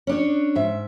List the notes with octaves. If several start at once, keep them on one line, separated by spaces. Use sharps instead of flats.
C#4 D4 C#5
G#2 E5